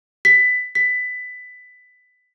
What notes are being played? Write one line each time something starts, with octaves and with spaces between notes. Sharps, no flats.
B6
B6